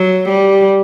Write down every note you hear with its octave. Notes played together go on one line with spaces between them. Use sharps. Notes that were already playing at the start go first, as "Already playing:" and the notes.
Already playing: F#3
G3